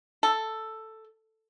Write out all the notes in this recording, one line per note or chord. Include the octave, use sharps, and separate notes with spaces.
A4